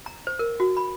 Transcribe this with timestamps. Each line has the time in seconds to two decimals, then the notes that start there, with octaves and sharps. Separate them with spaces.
0.06 A#5
0.27 C5
0.39 A#4
0.60 F#4
0.77 B5